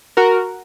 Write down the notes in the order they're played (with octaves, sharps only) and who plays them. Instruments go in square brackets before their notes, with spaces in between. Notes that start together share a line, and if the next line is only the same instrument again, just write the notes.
[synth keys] F#4 A#4